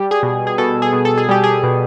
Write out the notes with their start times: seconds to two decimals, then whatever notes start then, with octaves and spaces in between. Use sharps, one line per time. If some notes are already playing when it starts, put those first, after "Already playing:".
Already playing: G3 G4
0.11 G#4
0.23 B2
0.47 G#4
0.58 B2 A4
0.82 G#4
0.93 B2
1.05 A4
1.18 G#4
1.29 G3 G4
1.44 G#4
1.63 B2